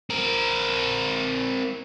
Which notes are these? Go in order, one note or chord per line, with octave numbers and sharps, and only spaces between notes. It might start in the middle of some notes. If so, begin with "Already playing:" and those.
C4 A#4